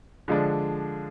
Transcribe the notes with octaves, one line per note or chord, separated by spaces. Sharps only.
D3 F3 G#3 D4